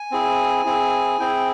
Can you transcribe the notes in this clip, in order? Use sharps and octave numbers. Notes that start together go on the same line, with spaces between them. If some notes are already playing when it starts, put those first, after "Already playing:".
Already playing: G#5
C4 E4 G#4
C4 E4 G#4
C4 E4 G#4 G5